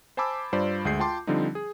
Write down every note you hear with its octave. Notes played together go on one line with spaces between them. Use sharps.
C5 G#5 A5 B5 D6 E6
G2 F4 C5 D5 B5
D2 G#3 G#4 G6 C7
F4 G5 A5 C6 D6
D3 F3 G3 C4 D#4
G#4